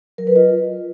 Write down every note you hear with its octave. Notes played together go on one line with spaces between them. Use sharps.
F#3 A#4
B4
F4 D#5